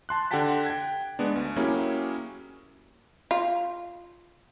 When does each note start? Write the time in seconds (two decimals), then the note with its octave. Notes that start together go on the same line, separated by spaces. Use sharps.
0.09 A5 C6 F#6
0.31 D3 G4 F#5 G5 A5 B6
0.66 G5 G#6
1.19 G#3 B3 D4
1.36 D2
1.56 F#3 A#3 C#4 E4 G4 G#4
3.31 F4